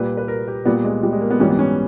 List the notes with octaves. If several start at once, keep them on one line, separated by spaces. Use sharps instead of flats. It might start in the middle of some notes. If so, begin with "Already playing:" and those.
Already playing: A#2 G3 B4
B4
A#4
G4
A#2 G3 B3
G#3
G3
G#3
A#3
B3
G#2 E3 G3 C#4
B3
C#4